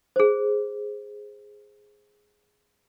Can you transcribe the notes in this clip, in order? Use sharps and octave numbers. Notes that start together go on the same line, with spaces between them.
G#4 C5